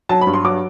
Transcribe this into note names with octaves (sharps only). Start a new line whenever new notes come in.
F#3 A5
B5
G2
C6
F#3 D6